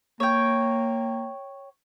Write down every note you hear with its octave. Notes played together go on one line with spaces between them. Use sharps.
A#3 C#5 G5